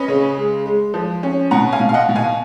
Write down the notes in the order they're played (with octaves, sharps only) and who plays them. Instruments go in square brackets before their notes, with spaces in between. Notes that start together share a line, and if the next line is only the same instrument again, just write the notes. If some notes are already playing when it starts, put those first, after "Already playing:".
Already playing: [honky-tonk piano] C#4 B4 D#5
C#3
G#3
G#3
F3
C#4
B2 F#5 A#5
F5 G#5
B2
F5
D#5 F#5
B2
F5 G#5